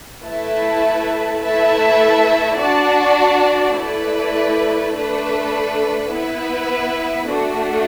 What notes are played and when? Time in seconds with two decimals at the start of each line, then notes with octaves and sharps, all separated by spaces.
0.24 A3 E4 B4 E5 A5
1.41 A3 E4 B4 E5 A5
2.58 D4 F#4 D5 A5
3.75 A3 E4 B4 D5
4.93 A3 D4 B4
6.10 B3 E4 B4
7.27 A3 D4 F#4